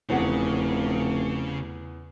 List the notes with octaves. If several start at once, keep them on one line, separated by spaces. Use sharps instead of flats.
F1 E2 C#3 F#5